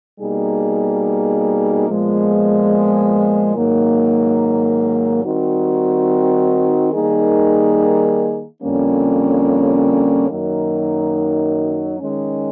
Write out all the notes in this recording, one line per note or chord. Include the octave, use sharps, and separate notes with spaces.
B2 G3 A#3 D#4 G#4
A#2 F3 G#3 B3
G#2 D#3 F#3 A#3
D#3 G3 C4 D#4 F#4
D#3 G3 A#3 D#4 G#4
F2 D3 G3 A#3 C#4
F#2 D#3 F#3 A#3 D#4
D#3 G#3 C#4